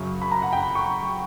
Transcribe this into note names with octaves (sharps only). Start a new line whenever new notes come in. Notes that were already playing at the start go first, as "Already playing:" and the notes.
Already playing: F#2 C#3 F#3 C#6
B5
A#5
F#5
G5
B5
C#6